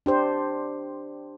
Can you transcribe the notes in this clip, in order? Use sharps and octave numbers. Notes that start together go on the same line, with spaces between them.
D4 G4 C5